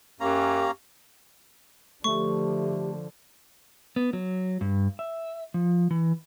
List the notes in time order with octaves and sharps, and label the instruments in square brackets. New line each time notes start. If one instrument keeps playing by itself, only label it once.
[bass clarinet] F#2 [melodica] A#3 C#4 A#5 [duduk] G4
[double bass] D3 F3 [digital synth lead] A3 [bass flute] G4 [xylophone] C#6
[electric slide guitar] B3
F#3
G2
E5
F3
E3